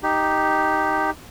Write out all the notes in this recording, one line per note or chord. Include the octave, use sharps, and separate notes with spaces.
D#4 G4